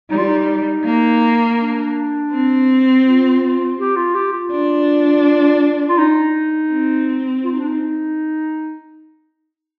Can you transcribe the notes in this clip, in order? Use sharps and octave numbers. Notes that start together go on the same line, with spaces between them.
G3 D#4
F4
D#4
A#3
D4
C4
F4
G4
F4
G4
F4
D4
F4
D#4
C4
F4
D#4
D4
D#4